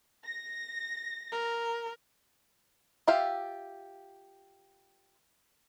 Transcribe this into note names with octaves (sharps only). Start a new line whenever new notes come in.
A#6
A#4
F4 G4 E5 F5